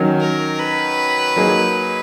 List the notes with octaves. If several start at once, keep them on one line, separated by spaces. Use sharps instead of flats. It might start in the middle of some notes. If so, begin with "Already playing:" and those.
Already playing: D#3 F#3 C#4
A#4
B4
F#3 A#3 D#4 G#4